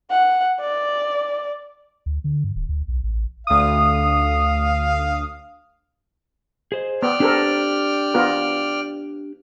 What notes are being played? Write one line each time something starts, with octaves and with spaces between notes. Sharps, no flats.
F#5
D5
D2
D3
G2
D1
D2
B1
A1
D2 F5 D#6
G#4 C5 D#5
B3 D5 G5 F6
C4 D4 G4 A4 A#4
B3 F4 A#4